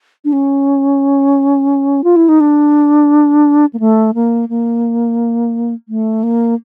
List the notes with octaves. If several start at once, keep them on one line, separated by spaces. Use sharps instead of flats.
D4
C#4
F4
E4
D#4
D4
A#3
A3
A#3
A#3
A3
A#3